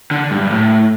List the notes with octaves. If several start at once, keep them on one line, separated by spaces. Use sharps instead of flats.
D3
G2
G2
A2